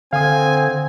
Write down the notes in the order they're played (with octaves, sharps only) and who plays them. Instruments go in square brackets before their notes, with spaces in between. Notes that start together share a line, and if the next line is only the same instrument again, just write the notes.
[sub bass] D3 [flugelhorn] C4 [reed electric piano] F5 D#6 [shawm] G#5